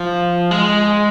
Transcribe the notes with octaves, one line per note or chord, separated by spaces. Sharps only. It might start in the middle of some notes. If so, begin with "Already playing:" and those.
Already playing: F3
G#3